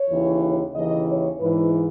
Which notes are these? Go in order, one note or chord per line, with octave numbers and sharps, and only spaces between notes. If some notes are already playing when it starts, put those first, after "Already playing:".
Already playing: C#5
D#2 C#3 E3
D#2 C#3 E3 D#5
C#5
G#2 E3 B4